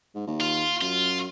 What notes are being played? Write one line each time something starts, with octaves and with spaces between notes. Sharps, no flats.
G#2
D#2
F4
F#2 F4